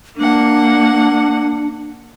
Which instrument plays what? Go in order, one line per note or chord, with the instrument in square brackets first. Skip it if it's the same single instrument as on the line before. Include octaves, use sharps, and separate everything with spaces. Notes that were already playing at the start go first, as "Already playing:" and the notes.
[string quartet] A#3 F#5 [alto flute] D4